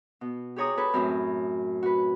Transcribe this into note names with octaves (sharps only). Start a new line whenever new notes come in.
B2
G4 G#4 C#5 A#5 D#6
A4 B4 C#5
F#2 A2 C4 C#4
F#4 B4